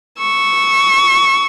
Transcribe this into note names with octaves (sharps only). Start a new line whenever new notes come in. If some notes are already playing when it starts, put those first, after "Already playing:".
C#6 E6